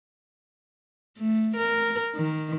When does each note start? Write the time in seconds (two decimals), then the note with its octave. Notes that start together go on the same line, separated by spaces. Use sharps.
1.18 A3
1.57 A#4
2.15 D#3